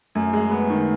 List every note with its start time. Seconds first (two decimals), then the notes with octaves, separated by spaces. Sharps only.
0.15 F#2 A3
0.33 G#3
0.51 B3
0.70 D#3